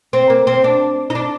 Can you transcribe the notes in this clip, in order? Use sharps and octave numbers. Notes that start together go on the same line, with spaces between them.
C4
A#3
C4
D4
D#4
D4